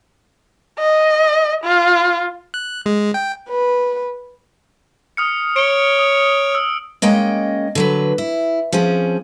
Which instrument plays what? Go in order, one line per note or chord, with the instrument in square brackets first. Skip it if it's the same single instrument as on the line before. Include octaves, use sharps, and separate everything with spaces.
[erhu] D#5
F4
[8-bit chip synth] F#6
G#3
G5
[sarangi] B4
[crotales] D#6 F6 C#7
[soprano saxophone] C#5 [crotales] D7 G7
[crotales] D#6
E6
[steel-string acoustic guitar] G#3 A#3 C#4 D#5 G5
D3 F#3 B4
E4
F3 C4 C#4 G#4